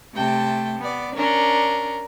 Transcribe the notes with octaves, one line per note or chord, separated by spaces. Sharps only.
C3 A3 G5 A5
B3 D5
C#4 D4 A#4